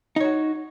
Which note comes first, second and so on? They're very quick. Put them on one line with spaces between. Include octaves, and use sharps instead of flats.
D#4 C#5 F#4